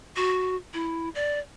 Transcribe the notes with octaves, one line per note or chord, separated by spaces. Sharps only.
F#4
E4
D5